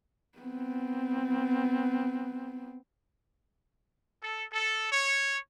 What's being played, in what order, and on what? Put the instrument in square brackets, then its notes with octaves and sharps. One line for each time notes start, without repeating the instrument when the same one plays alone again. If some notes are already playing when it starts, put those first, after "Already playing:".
[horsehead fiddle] B3 C4
[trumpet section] A4
A4
C#5